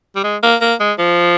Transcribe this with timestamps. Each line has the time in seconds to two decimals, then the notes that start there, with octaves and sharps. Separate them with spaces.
0.15 G3
0.24 G#3
0.43 A#3
0.61 A#3
0.80 G#3
0.99 F3